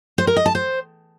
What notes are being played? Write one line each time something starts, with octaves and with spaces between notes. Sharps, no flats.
C5
A#4
D#5
A5
C5